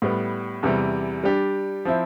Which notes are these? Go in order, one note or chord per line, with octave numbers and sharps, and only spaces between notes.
A2 G3 B3
E2 C3 E3 G3
G3 D4 G4
F3 C4 E4